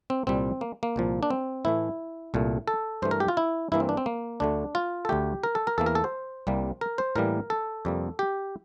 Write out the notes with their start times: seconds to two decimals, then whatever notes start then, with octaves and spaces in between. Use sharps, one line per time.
0.10 C4
0.27 C2 A#2 G3 C4
0.61 A#3
0.83 A#3
0.96 C2 A#2 F3
1.23 D4
1.30 C4
1.65 A2 E3 A3 E4
2.34 C2 A#2 A3
2.68 A4
3.02 G2 E3 A3 C5
3.11 A#4
3.20 G4
3.28 F4
3.37 E4
3.72 G2 E3 A#3 E4
3.80 C4
3.89 D4
3.97 C4
4.06 A#3
4.40 D2 D3 A3 D4
4.75 F4
5.05 A4
5.09 D2 D3 A3 G4
5.44 A#4
5.55 A4
5.67 A#4
5.78 E2 E3 A#3 A4
5.86 A#4
5.95 A4
6.04 C5
6.47 C2 C3 G3 A#3
6.81 A#4
6.98 C5
7.15 A2 E3 G3 A#3 A#4
7.50 A4
7.85 F2 C3 G3 A#3
8.19 G4